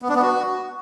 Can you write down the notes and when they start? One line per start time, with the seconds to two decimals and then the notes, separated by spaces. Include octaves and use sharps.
0.02 B3
0.09 D4
0.16 B3
0.22 F#4